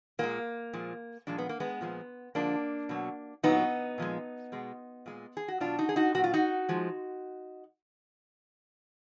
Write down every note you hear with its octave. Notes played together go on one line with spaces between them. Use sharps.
A#2 G#3 A#3
A#2 F3 G#3
A#2 F3 G#3 D4
B3
A#3
G#3 B3
A#2 F3 G#3
D3 F3 G#3 A#3 D4
B2 F#3
A#2 F#3 B3 D#4
A#2 F3 G#3
B2 G#3
A#2 G#3
G#4
F#4
B2 F#3 D4 F4
D#4 F#4
G#4
D#4 F#4
A#2 F#3 F#4
F4
D#4 F#4
F3 G#3